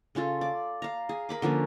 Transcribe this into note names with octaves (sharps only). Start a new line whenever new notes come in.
C#3 C#4 F4 A4
D5
F5 A#5
G#4
A#4 B5 D6
D3 F3 A#3 C#4